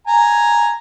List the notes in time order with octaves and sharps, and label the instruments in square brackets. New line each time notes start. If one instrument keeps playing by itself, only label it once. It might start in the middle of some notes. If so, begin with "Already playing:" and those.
[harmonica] G#5 A#5